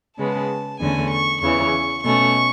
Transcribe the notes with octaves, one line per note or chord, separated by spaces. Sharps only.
C#3 G#3 B3 A5
E2 D3 A3 C#4 G#5
C#6
E2 C#3 E3 C#6
B2 A3 C#4 C#6